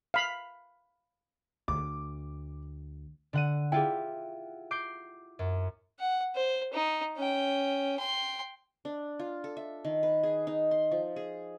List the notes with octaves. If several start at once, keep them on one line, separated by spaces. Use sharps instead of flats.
F5 B5
D2 D6
D3 F#5 D#7
E4 F4 G4 G#4 G5
D6 G6 C7
F#2
F#5
C5
D#4
C#4 G5
G5 C6
D4
F4
A4
E5
D#3
B4
G#4
D#4
C6
F3
G#4